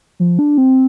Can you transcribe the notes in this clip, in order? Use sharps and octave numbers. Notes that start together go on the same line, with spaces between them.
F3
D4
C4